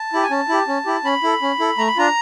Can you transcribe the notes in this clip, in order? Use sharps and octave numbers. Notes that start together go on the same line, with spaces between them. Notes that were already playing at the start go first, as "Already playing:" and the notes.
Already playing: A5
E4 G4
G#5
C#4 A5
E4 G4
C#4
E4 G4
C#4 B5
E4 A4
C#4
E4 A4
A3 A#5
B5
D4 F4 A#5